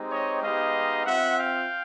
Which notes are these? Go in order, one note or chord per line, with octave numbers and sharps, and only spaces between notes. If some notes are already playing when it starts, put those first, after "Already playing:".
Already playing: G#3 C4 D#4 G4
C#5 D#5
G#3 B3 D#4 G4 D#5 F5
C4 F4 E5 F#5
F5 G5